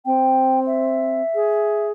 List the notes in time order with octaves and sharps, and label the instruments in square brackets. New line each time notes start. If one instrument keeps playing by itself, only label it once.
[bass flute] C4 [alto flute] G5
[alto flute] E5
[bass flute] G#4